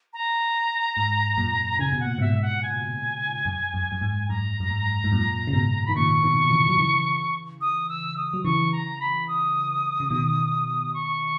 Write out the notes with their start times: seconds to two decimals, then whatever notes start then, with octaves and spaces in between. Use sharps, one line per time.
0.13 A#5
0.97 G#2
1.38 F#2 A#2
1.79 C#3 G#5
1.92 B2
2.00 A#2 F#5
2.18 G#2 B2 E5
2.42 F#5
2.63 G#5
3.45 F#2
3.74 F#2
3.92 F#2
4.01 G#2
4.29 F#2 A#5
4.60 F#2
4.70 G#2
5.04 G#2
5.12 F#2 A#2
5.47 C#3
5.53 G#2 B2
5.86 D#3 B5
5.95 A#2 C#3 C#6
6.23 B2 D#3
6.51 C#3 E3
6.68 F#3
6.78 C#3 E3
7.61 D#6
7.89 E6
8.17 D#6
8.34 F#3
8.44 C#3 E3 C#6
8.72 A#5
9.00 B5
9.28 D#6
10.00 C#3
10.10 B2 D#3
10.94 C#6